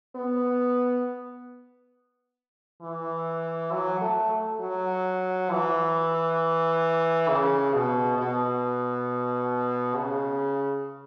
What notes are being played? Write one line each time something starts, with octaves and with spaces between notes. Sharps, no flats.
B3
E3
F#3
A3
F#3
E3
C#3
B2
B2
C#3